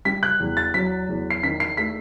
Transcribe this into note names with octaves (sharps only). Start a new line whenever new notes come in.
G3 B6
F#6
E2
A6
F#3 B6
E2
C7
D#3 B6
C7
A3 B6